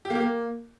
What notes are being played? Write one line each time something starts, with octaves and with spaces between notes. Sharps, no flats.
G4
A#3
G4
A#3